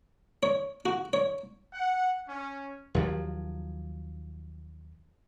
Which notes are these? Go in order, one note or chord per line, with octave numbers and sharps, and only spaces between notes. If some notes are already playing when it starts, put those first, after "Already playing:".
C#5
F#4
C#5
F#5
C#4
D#2 F3 F#3